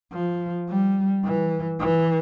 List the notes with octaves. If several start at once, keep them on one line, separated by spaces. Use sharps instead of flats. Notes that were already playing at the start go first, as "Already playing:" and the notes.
F3
G3
E3
E3